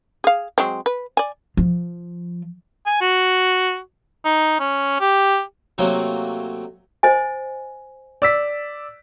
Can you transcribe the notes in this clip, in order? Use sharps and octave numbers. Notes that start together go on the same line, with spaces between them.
G#4 F5
F#3 G#3 C4
B4
D5 G#5
F3
G#5
F#4
D#4
C#4
G4
C3 F#3 A3 A#3 C4 F#4
C5 D#5 G#5
D5 E6 B6